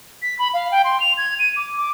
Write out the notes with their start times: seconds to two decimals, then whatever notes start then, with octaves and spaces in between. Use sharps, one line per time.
0.22 B6
0.39 B5
0.54 F5
0.72 G5
0.84 C6
1.00 F7
1.17 G#6
1.39 D#7
1.56 D6
1.77 D6